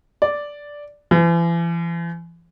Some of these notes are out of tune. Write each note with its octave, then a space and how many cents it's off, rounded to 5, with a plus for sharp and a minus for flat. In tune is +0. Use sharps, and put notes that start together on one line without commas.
D5 -5
E3 +40